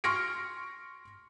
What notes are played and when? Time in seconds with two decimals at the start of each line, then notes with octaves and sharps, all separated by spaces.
0.04 C6 C#6 F6 A#6 C#7 D7